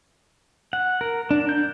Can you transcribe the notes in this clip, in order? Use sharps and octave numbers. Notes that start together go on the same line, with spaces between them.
F#5
A#4
D4
G6